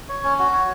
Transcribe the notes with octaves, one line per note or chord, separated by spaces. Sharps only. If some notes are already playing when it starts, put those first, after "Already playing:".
C#5
C#4
F#4
C#5